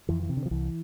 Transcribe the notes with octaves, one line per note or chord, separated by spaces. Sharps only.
F2 E3
E3
C3
D3
F3
C2 E3